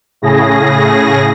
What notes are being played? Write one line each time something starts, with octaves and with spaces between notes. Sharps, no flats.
A2 C#3 G#4 A#6